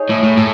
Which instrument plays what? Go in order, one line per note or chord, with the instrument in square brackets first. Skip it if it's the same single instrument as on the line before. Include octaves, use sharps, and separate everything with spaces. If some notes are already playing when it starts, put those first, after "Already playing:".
Already playing: [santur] D#4 G#4 C#5
[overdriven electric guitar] A2
A2
A2